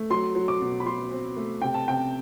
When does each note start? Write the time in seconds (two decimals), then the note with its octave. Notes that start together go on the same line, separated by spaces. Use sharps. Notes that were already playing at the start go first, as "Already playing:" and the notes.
Already playing: A3
0.10 F#3 C6
0.35 F#3
0.48 D6
0.61 B2
0.80 B5
0.85 F#3 C6
1.11 C4
1.37 A3
1.62 C3 G5
1.74 A5
1.88 C3 G5